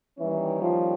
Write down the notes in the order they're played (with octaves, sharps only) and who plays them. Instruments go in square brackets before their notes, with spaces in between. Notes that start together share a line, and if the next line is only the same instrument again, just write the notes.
[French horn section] D#3 G3 A#3 C#4 [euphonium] E3
[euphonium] F3